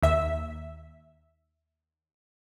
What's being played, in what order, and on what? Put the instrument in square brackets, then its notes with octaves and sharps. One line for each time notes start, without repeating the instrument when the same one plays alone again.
[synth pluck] D#2 E5